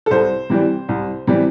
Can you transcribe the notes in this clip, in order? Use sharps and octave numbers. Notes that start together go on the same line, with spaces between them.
A4
C2 C5
C3 E3 G3
C2
C3 E3 G3